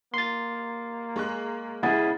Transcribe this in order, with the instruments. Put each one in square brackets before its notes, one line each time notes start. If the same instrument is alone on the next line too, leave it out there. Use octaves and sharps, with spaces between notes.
[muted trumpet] A#3 [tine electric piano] C6 A6
[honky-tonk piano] G#3 C#6 F#6
[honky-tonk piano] C#3 G#3 B3 [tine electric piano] E4 G#4 [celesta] F#5 A6